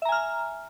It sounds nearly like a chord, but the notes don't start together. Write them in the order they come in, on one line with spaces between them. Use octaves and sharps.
E5 A#5 G#5 F6